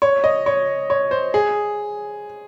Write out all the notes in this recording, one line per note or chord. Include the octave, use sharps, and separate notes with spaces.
C#5
D#5
C#5
C#5
C5
G#4